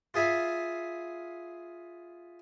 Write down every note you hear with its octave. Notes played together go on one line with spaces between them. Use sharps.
F4 G#4 E5 F5 B5